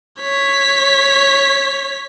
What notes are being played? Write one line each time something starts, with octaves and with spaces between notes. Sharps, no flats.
C#5 B6